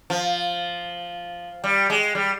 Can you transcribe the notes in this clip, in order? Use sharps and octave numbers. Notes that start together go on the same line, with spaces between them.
F3
G3
G#3
G3